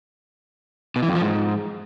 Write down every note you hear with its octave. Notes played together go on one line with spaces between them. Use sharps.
B2
E3
F2
F3
G#2